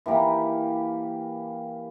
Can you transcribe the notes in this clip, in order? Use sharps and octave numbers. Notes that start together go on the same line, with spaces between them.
E3 A#3 G4 A#5